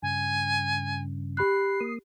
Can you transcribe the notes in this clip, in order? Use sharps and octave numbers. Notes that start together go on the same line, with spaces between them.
G2 C#3 G#5
G4 B5 F#6 C7
A#3 D#6